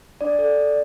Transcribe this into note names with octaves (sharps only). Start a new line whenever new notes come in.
D4 D5
A4 D5
D4